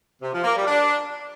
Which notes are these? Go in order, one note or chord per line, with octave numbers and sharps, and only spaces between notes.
C3
F3
A#3
G3
D4